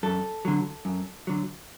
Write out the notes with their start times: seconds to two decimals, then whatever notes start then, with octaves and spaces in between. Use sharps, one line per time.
0.03 F#2 A4
0.45 D3 F#3
0.85 F#2
1.27 D3 F#3